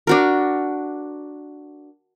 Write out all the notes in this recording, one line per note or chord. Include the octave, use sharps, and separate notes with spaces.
D4 F#4 A#4